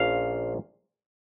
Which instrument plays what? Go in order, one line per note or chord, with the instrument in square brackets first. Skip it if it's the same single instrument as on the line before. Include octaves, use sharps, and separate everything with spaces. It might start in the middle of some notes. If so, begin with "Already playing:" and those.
Already playing: [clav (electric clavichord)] A#1 A#2 F3 C#4 F5